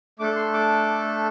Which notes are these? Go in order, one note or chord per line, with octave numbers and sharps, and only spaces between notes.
A3 D4 A4 D6
C6
D6